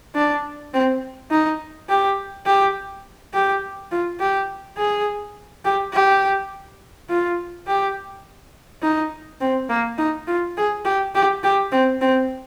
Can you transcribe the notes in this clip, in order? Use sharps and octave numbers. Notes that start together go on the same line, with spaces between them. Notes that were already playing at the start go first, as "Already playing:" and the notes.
D4
C4
D#4
G4
G4
G4
F4
G4
G#4
G4
G4
F4
G4
D#4
C4
A#3
D#4
F4
G#4
G4
G4
G4
C4
C4